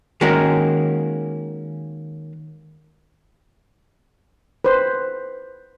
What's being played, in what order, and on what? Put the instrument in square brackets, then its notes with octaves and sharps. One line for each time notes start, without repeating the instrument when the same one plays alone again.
[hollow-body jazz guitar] D#3 G#3 A#3 C#4 F#4 A#4
[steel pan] B4 C5